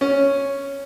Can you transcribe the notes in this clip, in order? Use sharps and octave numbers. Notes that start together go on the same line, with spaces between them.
C#4